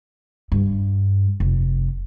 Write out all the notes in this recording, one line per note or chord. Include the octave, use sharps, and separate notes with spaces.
G2
F1